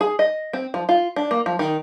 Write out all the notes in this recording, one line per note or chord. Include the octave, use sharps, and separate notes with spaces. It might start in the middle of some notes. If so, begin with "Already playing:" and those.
G#4
D#5
C4
F3
F4
D4
A#3
F3
D#3